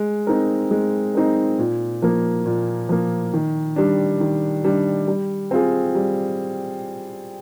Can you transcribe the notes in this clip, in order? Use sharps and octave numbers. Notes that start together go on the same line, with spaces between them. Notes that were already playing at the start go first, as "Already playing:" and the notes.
Already playing: G#3
C4 D#4 A#4
G#3
C4 D#4 A#4
A#2
F3 A#3
A#2
F3 A#3
D#3
G3 D4
D#3
G3 D4
G3
C4 F4 G#4
G3